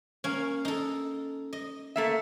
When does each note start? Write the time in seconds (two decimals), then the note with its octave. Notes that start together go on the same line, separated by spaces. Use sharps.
0.24 A#3 C#4
0.65 D#4 A4
1.53 D#5
1.96 A3 A#3 E5